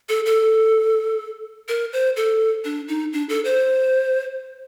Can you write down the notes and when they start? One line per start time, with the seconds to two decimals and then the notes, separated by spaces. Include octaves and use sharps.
0.09 A4
0.26 A4
1.68 A#4
1.93 C5
2.16 A4
2.65 D4
2.88 D#4
3.13 D4
3.29 A4
3.45 C5